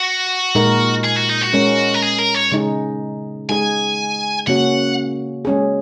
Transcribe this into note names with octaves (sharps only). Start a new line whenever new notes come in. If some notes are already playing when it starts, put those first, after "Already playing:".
Already playing: F#4
A#2 G#3 D#4 A#4
G#4
F#4
D#4
F#4
G#3 C#4 A#4
A#4
G#4
A#4
C#5
C#3 G#3 D#4 G#4
G#3 D#4 G#4 G#5
C#3 A#3 C#4 F#4 F#5
G#3 C#4 G#4